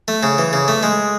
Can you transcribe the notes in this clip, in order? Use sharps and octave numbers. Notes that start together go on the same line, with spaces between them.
A3
C#3
E3
C#3
A3
G#3